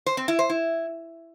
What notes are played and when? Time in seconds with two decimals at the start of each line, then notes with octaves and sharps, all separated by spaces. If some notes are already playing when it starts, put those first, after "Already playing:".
0.06 C5
0.17 C4
0.28 E4
0.39 C5
0.50 E4